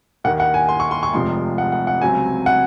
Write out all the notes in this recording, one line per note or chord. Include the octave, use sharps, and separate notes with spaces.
D#2 D#3 A#3 F#5
F#5
G#5
C6
C#6
C6
C#6
F1 F2 C3 F3 G#3 C6
F#5
F#5
F#5
C#2 C3 F#3 C4 G#5
F#5